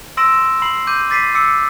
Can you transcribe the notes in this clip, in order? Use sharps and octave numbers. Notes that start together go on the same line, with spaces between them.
C6 E6 A#6 D7 E7
B5 C7 F#7
D6 G6 D#7
D6 A6 B6 C7 D#7
D6 E6 C#7